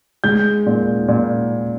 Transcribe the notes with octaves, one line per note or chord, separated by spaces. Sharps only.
G#3 G6
A#2
A#2